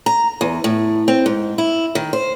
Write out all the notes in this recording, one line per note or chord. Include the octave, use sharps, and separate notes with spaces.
A#5
E2
A2
C4
G#2
E4
D#3
C5